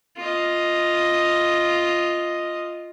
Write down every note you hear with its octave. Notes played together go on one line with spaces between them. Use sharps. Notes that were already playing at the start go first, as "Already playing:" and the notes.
F4 D#5